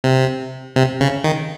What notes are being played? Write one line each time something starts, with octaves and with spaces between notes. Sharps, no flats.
C3
C3
C#3
D#3